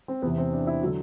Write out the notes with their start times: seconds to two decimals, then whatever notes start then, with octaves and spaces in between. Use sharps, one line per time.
0.08 C4
0.22 E2 C3 E3 B3
0.38 C4
0.53 D4
0.67 E4
0.82 D3 F#3 F#4